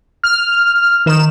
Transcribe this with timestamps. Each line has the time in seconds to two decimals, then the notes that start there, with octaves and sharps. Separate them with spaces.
0.24 F6
1.06 D#3 E7